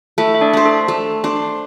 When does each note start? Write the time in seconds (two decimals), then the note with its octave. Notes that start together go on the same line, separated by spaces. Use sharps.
0.18 A3 E4 E5
0.35 E5
0.41 D4 D5
0.53 D4 C5
0.66 A4
0.88 A3
1.24 D4 C5